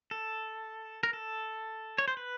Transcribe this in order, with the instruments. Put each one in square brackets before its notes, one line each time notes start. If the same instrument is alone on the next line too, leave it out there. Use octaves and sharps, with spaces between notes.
[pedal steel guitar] A4
A#4
A4
C#5
C5
B4